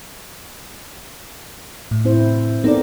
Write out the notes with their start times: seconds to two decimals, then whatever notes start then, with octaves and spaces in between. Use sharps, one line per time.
1.91 A2
2.05 C4 E4 C5
2.64 B3 C4 D#4 A4 A#4 D5